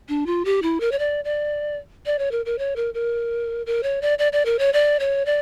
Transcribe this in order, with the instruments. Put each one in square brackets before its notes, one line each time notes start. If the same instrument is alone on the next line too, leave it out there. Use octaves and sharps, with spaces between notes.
[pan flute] D4
F4
G4
E4
A#4
C#5
D5
D5
D5
C#5
A#4
A#4
C#5
A#4
A#4
A#4
C#5
D5
D5
D5
A#4
C#5
D5
C#5
D5